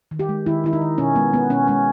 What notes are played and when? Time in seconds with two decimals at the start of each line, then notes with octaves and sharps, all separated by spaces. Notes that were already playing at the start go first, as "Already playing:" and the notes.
0.11 D#3
0.19 G4
0.29 G#3
0.46 D#3 E4
0.64 D#3 E4
0.73 D#4
0.81 D#3
0.98 B2 C#4
1.15 G#3 B3
1.33 G#3 B3
1.50 B2 C#4
1.68 G#3 C#4